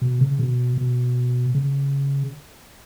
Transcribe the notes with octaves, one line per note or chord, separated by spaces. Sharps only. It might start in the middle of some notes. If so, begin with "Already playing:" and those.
B2
C#3
B2
B2
C#3